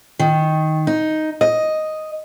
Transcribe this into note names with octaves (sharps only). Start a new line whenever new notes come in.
D#3
D#4
D#5